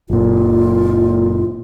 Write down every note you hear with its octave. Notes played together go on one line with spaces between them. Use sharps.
F#1 A#2 F4